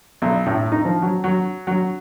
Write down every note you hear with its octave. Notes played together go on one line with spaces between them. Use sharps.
B1
A2
D#4
F3
F#3
F#3
F#3